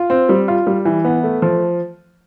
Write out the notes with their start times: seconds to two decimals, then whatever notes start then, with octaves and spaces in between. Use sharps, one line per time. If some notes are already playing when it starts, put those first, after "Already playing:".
Already playing: F4
0.10 C4
0.29 G3
0.48 F4
0.67 G3
0.85 E3
1.05 B3
1.24 A3
1.42 F3